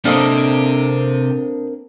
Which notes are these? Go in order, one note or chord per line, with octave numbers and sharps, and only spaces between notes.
C3 A#3 C4 D4 A4 A#4 D#5